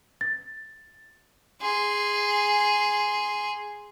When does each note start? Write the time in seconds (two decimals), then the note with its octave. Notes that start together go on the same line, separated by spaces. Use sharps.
0.21 A6
1.61 G#4 C6